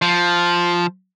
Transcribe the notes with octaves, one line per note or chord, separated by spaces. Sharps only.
F3